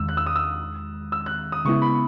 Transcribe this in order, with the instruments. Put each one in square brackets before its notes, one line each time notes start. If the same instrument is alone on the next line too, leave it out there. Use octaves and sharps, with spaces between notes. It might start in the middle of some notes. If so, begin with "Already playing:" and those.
Already playing: [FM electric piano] E2 D#3 G#3 [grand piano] E6
[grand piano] F#6
E6
D#6
E6
E6
F#6
D#6
[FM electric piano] C#3 G#3 B3 E4 [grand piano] C#6
[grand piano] B5